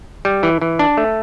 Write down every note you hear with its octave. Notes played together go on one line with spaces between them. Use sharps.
G3
E3
E3
D4
A3